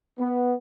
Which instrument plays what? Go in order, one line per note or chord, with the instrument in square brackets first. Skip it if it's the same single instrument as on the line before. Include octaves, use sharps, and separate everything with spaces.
[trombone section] B3